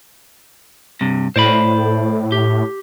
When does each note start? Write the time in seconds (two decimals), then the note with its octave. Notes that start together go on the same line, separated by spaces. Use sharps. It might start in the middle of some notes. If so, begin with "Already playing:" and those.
1.01 G2 C3
1.36 A2 C5 D5 B5
2.32 G4